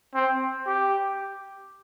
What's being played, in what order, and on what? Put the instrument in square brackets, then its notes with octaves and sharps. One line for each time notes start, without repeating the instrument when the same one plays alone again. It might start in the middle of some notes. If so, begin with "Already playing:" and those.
[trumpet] C4
G4